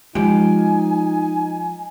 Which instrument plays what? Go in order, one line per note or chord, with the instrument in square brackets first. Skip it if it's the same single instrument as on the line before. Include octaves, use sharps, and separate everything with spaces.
[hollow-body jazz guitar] F3 G4 [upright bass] G#3 [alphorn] D#4 [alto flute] G#5